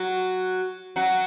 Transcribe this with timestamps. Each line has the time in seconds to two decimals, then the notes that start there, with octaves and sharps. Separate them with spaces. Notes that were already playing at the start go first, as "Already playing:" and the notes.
Already playing: F#3 F#4
0.96 F#3 F#4